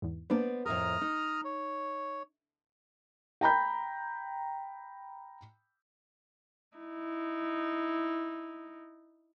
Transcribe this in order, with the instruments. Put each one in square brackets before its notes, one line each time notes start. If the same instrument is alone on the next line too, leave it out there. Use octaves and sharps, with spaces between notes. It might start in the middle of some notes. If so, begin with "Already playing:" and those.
[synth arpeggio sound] E2 G#2
[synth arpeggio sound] A#3 D4 B4 [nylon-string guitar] B3 C5 D5
[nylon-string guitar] F2 A2 A#4 [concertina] A#5 D#6 F6
[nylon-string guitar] D#4
[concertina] C#5
[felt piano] G5 A#5 B5 G6
[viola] D#4 E4